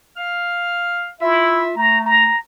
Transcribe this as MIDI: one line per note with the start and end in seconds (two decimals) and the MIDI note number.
0.17 1.07 77
0.17 1.07 89
1.21 1.67 64
1.21 1.71 65
1.21 1.71 76
1.76 2.28 57
1.76 2.05 82
2.06 2.38 82